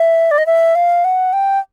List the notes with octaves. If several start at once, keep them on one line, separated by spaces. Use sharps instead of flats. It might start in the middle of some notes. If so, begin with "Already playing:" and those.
Already playing: E5
D5
D#5
E5
F5
F#5
G5